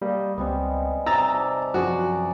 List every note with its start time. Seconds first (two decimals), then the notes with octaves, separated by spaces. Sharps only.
0.02 G3 A#3 D#5
0.38 C#2 G3 G#3 B3 C4
1.06 C3 D#4 A#5 E6 A6
1.31 G4 D5 A5
1.74 F#2 F3 F#4 G#4 D5